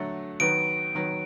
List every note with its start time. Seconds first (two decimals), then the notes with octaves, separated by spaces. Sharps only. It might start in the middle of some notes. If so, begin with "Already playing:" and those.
Already playing: D3 F#3 A3
0.40 D#3 F#3 B3 D7
0.95 D#3 F#3 B3